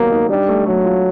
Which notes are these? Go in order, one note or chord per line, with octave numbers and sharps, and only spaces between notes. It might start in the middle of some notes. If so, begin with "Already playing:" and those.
Already playing: D#3 F#3 A#3 B3 G4
D#4
G3 D4
A3
F#3 A3
F4